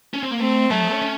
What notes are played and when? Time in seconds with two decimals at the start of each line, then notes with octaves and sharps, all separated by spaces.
0.14 C#4
0.23 C4
0.31 A#3
0.40 A3 C4
0.70 F#3 A3
0.81 F3
0.91 C#4
1.02 C#4